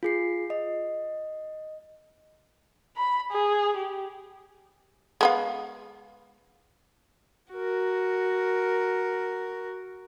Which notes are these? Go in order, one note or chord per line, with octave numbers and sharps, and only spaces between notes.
F4 G#4 C7
D#5
B5
G#4
G4
G#3 B3 F5
F#4 A#4